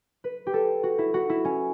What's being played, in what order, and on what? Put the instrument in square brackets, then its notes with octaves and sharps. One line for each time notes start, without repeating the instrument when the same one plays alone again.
[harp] B4
G4
A4
F#4
E4
F#4
E4
C#4